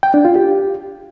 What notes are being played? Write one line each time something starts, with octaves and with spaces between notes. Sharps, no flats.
G5
D4
F4
G4